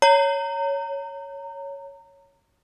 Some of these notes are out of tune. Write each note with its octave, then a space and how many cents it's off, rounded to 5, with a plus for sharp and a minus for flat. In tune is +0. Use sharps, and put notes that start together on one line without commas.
C#5 +5 A#5 -25